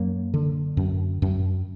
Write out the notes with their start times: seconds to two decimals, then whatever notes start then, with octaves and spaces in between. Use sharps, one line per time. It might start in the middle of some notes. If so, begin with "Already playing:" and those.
Already playing: F#2 F#3 A#3
0.34 D3
0.77 F#2
1.22 F#2